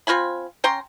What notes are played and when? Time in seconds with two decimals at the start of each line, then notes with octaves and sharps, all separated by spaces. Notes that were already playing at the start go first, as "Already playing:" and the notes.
0.07 C4 F4 G#5 B5
0.64 C#4 G5 A#5 C6